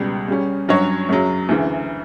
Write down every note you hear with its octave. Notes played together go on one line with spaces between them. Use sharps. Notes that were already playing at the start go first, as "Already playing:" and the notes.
Already playing: C#2 B2 G3
C#3 G3 C#4
G2 F#3 C#4 F#4 C#5
F#2 C#3 F#3
D2 C#3 E3